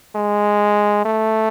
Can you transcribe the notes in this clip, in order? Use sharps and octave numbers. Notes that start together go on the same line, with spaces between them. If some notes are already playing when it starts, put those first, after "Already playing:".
G#3
A3